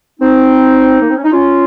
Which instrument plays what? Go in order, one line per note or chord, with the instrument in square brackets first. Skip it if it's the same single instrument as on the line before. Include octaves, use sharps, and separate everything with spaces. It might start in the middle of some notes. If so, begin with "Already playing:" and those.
[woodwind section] C4 D#4
A#3
C4
C#4
D#4
C#4 F4